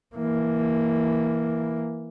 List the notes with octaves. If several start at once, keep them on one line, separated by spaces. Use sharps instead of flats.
E3 A#3